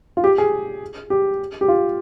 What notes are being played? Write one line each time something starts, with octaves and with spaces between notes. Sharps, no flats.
F4
G4
G#4
G4
G4
F4